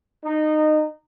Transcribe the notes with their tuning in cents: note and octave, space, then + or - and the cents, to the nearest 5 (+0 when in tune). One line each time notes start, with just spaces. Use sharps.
D#4 -20